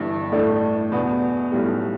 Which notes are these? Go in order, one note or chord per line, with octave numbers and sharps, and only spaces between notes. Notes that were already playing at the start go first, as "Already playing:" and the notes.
Already playing: G1 G2 E3
A2 A3 D4
E2 B2 B3 D4
B1 A2 G3